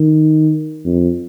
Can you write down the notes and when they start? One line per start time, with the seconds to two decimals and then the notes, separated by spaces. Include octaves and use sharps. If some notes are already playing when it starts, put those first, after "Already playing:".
Already playing: D#3
0.86 F2